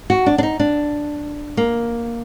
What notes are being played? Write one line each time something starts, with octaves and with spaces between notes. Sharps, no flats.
F#4
D4
D4
D#4
D4
A#3